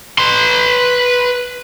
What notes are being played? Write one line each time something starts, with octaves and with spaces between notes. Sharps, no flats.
B4 C6